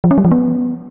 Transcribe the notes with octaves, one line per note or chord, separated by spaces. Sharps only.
F3
C#4
G3
F3
B3